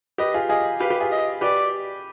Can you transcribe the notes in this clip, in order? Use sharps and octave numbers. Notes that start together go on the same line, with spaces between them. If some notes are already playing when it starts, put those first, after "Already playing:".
G4 B4 D#5
F4 G#4
F4 G#4 D#5
G4 B4 F5
G4 B4
F4 G#4
D#5
G4 B4 D5